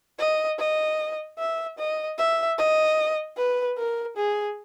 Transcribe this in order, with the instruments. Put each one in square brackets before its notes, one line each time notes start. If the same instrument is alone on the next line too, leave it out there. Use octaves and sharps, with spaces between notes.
[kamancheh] D#5
D#5
E5
D#5
E5
D#5
B4
A#4
G#4